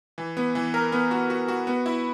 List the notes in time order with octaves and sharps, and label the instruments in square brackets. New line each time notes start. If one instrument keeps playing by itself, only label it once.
[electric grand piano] E3
B3
E3
A#4
B3
F#4
F#4
F#4
B3
E4